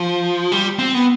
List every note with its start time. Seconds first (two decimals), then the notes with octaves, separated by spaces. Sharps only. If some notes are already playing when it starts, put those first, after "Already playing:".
Already playing: F3
0.52 G3
0.79 C4
0.94 B3